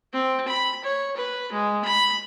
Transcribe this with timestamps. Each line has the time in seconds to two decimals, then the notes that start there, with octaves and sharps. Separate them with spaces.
0.13 C4
0.47 B5
0.83 C#5
1.16 B4
1.52 G#3
1.84 B5